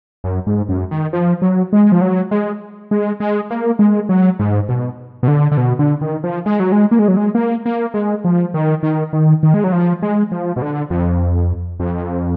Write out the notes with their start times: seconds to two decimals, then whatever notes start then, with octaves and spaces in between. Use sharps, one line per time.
0.24 F#2
0.47 G#2
0.69 F#2
0.91 D#3
1.13 F3
1.42 F#3
1.73 G#3
1.92 F3
2.01 F#3
2.31 G#3
2.91 G#3
3.20 G#3
3.50 A#3
3.79 G#3
4.09 F#3
4.39 G#2
4.69 B2
5.23 B2
5.28 D3
5.52 D3
5.57 B2
5.79 D3
6.01 D#3
6.24 F3
6.46 G#3
6.60 F#3
6.72 G#3
6.91 A#3
6.99 G#3
7.08 F#3
7.17 G#3
7.35 A#3
7.65 A#3
7.94 G#3
8.24 F3
8.54 D#3
8.83 D#3
9.13 D#3
9.43 D#3
9.54 G#3
9.64 F#3
9.72 F3
10.02 G#3
10.32 F3
10.56 B2
10.62 D3
10.90 F2
11.80 F2